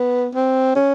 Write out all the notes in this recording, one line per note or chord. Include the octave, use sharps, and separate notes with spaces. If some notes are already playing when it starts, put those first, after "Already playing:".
Already playing: B3
C4
C#4